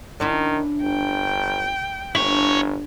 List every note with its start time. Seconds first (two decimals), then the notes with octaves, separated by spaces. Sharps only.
0.20 D#3 C#4 D4 E4
0.83 G1 G5
2.15 G1 D4 E4 C#5